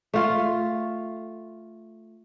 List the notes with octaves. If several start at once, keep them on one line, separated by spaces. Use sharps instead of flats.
A3 F4